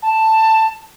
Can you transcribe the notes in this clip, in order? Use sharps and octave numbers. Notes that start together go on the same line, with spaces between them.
A5